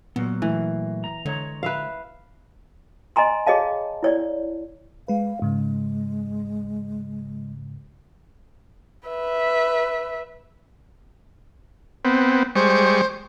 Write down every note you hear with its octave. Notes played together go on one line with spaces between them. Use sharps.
A#2 F#3 A#3 B3
E3 A3
A#5
D3 G#3 C#5 A#5
B4 E5 F5
D#5 G#5 A#5 C6
G#4 C#5 D#5 F5 A5
E4 C#5 D5
G#3 B4 F5
G#2 C#3 G#3
B4 E5
B3 C4
G3 G#3 C5 C#6